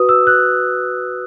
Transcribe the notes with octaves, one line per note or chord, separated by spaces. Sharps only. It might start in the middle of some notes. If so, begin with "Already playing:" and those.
Already playing: F#4 B4 D#6
E6
F#6